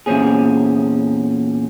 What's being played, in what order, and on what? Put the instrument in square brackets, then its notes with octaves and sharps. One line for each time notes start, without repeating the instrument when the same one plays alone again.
[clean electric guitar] E2 A#2 C#3 C4 C#4 G#4